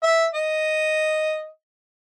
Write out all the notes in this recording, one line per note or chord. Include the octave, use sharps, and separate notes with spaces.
E5
D#5